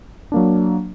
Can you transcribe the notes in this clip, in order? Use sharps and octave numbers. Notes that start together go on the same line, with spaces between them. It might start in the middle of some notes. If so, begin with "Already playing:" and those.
F#3 A#3 D4